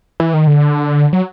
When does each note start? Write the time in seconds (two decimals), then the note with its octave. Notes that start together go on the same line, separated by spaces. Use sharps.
0.20 E3
0.34 D#3
0.47 D3
1.13 F#3